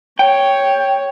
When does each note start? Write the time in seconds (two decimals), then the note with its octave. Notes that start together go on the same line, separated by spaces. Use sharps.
0.19 C#5 G5